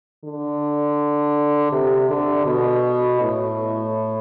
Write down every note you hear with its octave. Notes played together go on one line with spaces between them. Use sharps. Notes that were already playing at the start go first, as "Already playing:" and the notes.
D3
C3
D3
B2
A2